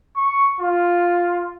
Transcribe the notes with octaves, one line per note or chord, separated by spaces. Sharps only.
C#6
F4